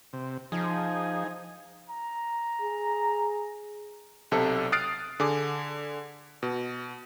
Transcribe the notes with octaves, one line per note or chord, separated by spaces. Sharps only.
C3
F3 D#4 G#4
A#5
G#4
B1 C3 A4
D#6 F6 F#6 A6 C7 D7
D3 G#4 D6
B2